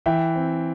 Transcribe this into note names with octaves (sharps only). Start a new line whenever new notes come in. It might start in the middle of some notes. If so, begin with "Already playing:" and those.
E3 E5 G5
C4